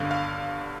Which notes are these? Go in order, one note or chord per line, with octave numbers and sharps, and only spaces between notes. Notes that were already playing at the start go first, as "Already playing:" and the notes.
Already playing: G1 G2 D3 F5
F5